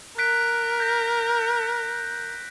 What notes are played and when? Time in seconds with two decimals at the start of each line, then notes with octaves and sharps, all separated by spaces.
0.18 A#4 F#6 B6 D7
0.80 G6 A#6